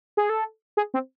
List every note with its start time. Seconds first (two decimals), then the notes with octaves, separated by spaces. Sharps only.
0.17 G#4
0.29 A4
0.77 G#4
0.94 C4